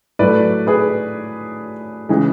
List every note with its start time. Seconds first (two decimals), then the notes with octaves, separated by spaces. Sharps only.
0.19 A2 F#3 A3 B4 D5
0.67 G#4 B4
2.09 C#3 E3 G#3